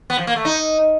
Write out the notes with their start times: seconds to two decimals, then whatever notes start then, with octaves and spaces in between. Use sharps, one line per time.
0.10 B3
0.19 F3
0.27 A#3
0.36 A3
0.45 D#4